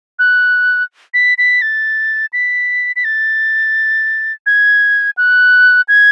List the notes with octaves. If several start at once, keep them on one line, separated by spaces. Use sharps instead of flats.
F#6
B6
B6
A6
B6
B6
A6
G#6
F#6
G#6